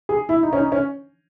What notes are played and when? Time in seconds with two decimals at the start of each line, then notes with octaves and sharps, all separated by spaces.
0.09 G#4
0.29 E4
0.43 D#4
0.53 C#4
0.58 D#4
0.72 C#4